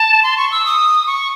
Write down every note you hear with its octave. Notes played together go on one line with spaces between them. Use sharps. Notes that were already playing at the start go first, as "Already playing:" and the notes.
Already playing: A5
C6
C#6
E6
D#6
C#6